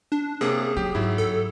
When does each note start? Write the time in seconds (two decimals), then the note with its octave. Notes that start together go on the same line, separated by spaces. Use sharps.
0.12 D4
0.41 C3 A#3 C#4 G#4
0.77 F#3 C#4 G4
0.95 G#2 F#3 E4
1.18 A4